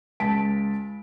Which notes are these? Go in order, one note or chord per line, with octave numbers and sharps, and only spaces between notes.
C#2 A5 B6 D7